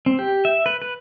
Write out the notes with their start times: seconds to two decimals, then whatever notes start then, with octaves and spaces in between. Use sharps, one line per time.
0.06 C4
0.19 G4
0.45 E5
0.66 B4
0.82 B4